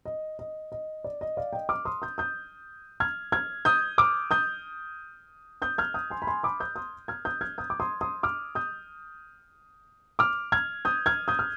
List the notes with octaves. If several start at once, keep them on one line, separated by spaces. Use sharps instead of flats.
D#5
D#5
D#5
D5
D#5
D5 F5
D#5 G5
D6 F6
C6 D#6
D#6 G6
D#6 G6
F6 G#6
F6 G#6
D#6 G6
D6 F6
D#6 G6
D#6 G6
F6 G#6
D#6 G6
G#5 C6
B5
G#5 C6
B5 D6
D#6 G6
C6 D#6
F6 G#6
D#6 G6
F6 G#6
D#6 G6
D6
C6 D#6
C6 D#6
D6 F6
D#6 G6
D6 F6
F6 G#6
D#6 G6
F6 G#6
D#6 G6
F6